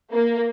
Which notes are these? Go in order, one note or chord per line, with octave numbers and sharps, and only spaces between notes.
A#3